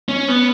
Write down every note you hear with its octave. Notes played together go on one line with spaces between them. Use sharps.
C#4
B3